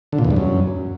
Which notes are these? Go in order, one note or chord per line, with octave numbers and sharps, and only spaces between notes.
D3
A#2
E2
G2
F#2